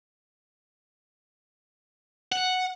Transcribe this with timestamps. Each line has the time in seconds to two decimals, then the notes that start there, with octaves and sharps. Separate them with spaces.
2.32 F#5